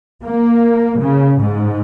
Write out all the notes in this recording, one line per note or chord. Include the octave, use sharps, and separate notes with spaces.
A#3
C#3
G#2